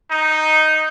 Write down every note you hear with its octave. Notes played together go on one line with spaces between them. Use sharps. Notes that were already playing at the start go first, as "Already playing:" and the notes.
D#4